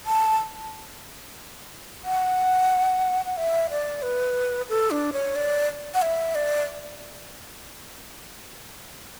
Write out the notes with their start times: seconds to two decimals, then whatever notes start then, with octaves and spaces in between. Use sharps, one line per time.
0.06 A5
2.04 F#5
3.25 F#5
3.37 E5
3.70 D5
4.02 B4
4.69 A4
4.91 D4
5.13 C#5
5.36 D5
5.94 F#5
6.02 E5
6.35 D5